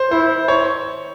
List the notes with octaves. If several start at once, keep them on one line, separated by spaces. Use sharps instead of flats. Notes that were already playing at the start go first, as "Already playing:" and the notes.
Already playing: C5
E4 C5
C#5